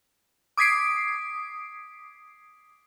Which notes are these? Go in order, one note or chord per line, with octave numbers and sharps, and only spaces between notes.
D6 D#6 G#6 B6 C7 D7